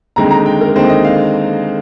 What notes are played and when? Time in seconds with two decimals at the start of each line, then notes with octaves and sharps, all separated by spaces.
0.16 D#2 D3 G#3 C4 D#4 A#5
0.31 A#5
0.46 G5
0.61 A#4
0.75 D#2 D3 G#3 C4 D#4 C5
0.89 D#5
1.05 F5